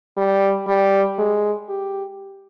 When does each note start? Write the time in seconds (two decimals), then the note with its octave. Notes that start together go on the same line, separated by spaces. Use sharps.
0.17 G3
0.67 G3
1.18 G#3
1.69 G4